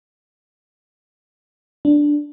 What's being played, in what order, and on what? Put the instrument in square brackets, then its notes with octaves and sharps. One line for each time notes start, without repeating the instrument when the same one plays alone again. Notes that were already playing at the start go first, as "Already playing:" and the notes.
[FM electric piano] D4